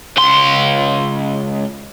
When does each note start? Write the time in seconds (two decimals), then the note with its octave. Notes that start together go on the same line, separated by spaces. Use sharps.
0.17 C#2 C6